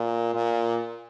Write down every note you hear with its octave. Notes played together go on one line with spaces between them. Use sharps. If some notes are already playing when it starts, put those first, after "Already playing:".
Already playing: A#2
A#2